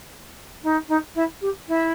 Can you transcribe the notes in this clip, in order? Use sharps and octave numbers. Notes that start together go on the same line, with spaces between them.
D#4
D#4
E4
G4
E4